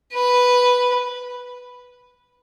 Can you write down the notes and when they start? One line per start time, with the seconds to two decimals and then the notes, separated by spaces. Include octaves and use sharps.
0.13 B4